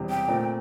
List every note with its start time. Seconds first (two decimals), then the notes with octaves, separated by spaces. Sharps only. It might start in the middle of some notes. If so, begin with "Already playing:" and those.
Already playing: E1 E2 C3 G3
0.10 G5
0.28 A#2 A3 C4